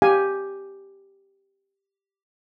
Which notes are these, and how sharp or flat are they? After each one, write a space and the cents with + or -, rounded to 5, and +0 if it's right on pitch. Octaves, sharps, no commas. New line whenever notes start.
G4 +0 F5 +15 G#5 +0